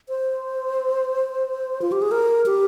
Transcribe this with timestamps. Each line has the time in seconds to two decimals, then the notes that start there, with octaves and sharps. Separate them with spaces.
0.09 C5
1.82 F4
1.92 G4
2.02 G#4
2.12 A#4
2.46 G4